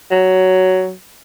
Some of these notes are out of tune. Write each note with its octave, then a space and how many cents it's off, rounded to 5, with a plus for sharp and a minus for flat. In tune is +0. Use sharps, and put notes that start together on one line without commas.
F#3 +10